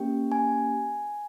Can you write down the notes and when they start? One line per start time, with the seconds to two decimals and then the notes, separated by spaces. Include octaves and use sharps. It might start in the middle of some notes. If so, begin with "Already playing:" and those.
Already playing: A#3 C#4 G4 G5
0.32 G#5